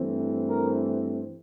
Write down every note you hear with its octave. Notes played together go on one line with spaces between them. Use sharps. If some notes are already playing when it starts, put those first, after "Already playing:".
Already playing: G2 E3 A3 C4
A#4